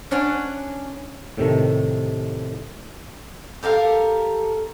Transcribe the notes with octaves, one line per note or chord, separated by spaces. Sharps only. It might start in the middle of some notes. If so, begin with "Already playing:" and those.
C#4 D4 C#5 D5 F#5
A2 C3 D#3 A3
G4 A4 A#4 F5